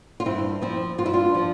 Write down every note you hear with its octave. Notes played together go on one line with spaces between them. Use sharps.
F4
G2 C4 E4
F3 C4 E4
G2 F4
E4
D4 F4
F3